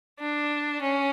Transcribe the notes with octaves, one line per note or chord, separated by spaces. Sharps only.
D4
C#4